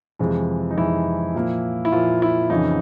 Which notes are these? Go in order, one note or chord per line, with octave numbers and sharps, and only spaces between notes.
F2 C3 E3 G#3
D#4
F2 C3 E3 G#3 E4
A#2 F3 A#3
E4
A#2 F3 A#3 F4
E4
F2 C#3 E3 D#4